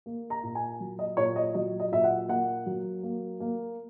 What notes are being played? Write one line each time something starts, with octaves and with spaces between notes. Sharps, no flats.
A#3
A#5
A#2
G#5
F#3
D#5
A#2 C#5
D#5
F#3 D#5
D#5
A#2 E5
F#5
A#3 F#5
F#3
A#3
A#3